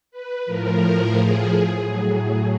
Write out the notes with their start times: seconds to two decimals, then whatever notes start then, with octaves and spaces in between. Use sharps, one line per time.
0.11 B4
0.46 A2 F3 A#4
1.14 G#4
1.83 A2 F#3